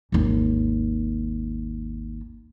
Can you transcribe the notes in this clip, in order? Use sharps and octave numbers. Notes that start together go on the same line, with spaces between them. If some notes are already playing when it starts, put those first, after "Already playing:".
G#1 D#2